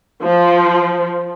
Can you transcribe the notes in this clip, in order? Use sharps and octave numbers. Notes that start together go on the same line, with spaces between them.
F3